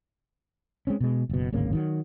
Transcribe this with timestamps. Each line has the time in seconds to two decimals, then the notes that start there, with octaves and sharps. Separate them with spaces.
0.87 G#3 C4 C#4
1.00 B2 G#3
1.29 F#1 B2
1.53 D1 G#1 C#3 A#3
1.73 D#3 E3 F#3